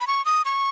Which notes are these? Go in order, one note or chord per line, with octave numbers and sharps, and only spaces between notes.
B5
C#6
D#6
C#6